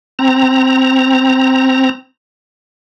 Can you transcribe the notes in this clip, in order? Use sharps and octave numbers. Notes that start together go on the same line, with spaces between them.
C4 A#5